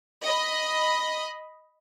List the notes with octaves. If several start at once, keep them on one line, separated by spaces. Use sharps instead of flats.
D#5 B5